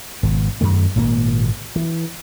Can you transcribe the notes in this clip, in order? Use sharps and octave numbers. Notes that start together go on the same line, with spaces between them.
G#1 B2
F#2 D#3 A3
G#1 A#2 A#3
E3